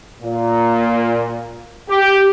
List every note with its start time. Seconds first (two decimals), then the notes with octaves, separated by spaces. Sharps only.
0.21 A#2
1.89 G4